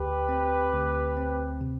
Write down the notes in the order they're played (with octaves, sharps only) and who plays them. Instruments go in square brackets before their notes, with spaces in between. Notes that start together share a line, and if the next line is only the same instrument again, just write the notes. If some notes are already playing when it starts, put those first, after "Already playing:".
Already playing: [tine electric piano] D2 [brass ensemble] G4 B4
[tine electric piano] C4
D2
C4
C3